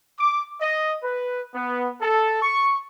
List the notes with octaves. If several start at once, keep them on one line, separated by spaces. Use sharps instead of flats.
D6
D#5
B4
B3
A4
C#6